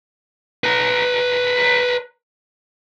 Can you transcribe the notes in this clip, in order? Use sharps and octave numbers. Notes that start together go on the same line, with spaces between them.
B4 A#5